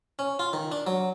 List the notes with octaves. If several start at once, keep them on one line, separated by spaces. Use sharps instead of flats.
C#4
F4
D#3
D4
F#3